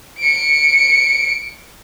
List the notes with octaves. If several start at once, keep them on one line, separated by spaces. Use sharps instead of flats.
C#7 D7